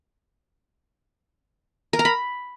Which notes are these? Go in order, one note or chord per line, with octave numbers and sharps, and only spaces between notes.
A#4
A#5
B5